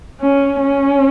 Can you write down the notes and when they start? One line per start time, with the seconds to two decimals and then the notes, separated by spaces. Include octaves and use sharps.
0.21 C#4
0.61 C#4